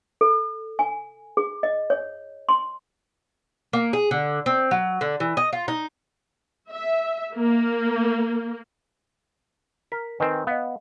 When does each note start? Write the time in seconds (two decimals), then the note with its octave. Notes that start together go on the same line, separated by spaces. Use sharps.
0.21 A4
0.79 G#5
1.37 G#4
1.63 D#5
1.90 C#5
2.49 C6
3.73 A#3
3.93 G#4
4.11 D3
4.46 C4
4.71 F#3
5.01 D3
5.20 E3
5.37 D#5
5.53 F4
5.68 D#4
6.70 E5
7.36 A#3
9.92 A#4 B6
10.20 D#3 C4 B4 D#5 G#5
10.47 B3 D#5 F5